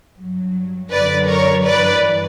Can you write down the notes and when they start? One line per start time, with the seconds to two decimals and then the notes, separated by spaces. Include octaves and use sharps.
0.17 G2 F#3
0.91 F#2 D3 F#3 B4 D5
1.28 A#4 C#5
1.65 G2 E3 B4 D5